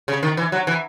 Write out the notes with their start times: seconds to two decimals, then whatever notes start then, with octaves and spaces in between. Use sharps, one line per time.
0.08 C#3
0.23 D#3
0.37 E3
0.52 F#3
0.67 E3